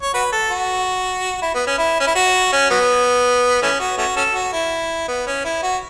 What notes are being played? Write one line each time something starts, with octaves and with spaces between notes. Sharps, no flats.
C#5
F#4 B4
A4
F#4
E4
B3
C#4
E4
C#4
E4
F#4
C#4
F#3 B3
E3 A3 C#4
F#4
A3 C#4 F#4
C#4 F#4 A4
F#4
E4
B3
C#4
E4
F#4